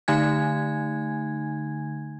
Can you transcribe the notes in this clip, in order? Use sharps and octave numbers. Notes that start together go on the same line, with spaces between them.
D3 A3 D#4 G#5 G#6